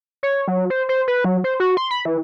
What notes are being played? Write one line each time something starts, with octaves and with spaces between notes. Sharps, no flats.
C#5
F#3
C5
C5
B4
F#3
C5
F#4
C6
B5
E3